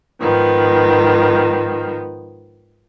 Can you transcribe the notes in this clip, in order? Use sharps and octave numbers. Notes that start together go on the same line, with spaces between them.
G#2 D#3 F3 B3